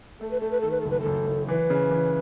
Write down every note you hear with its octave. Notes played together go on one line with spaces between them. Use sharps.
A3 A4
B4
A3 A4
B4
D#3 A4
B4
F#1 A4
B4
A4
F#1
F#1
E3 B4
C#3
E3